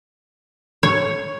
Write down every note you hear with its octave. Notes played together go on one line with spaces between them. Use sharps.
C#5